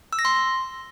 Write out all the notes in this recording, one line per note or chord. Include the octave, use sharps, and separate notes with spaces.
E6
A#6
C6